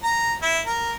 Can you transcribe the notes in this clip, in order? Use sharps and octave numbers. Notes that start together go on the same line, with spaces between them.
A#5
E4
A#4